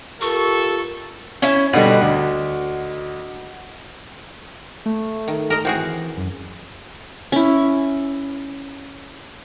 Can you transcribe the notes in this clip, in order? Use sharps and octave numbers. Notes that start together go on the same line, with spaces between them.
F4 G4 A4 A#4 C#6
C#4 E4
B2 D3 G3 F#4 D#5 F#5
D2
A3
D#3
A#4 D#5
E3 C4 F#4 G#4
F#2
C#4 E4